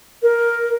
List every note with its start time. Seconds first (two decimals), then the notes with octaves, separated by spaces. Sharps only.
0.23 A#4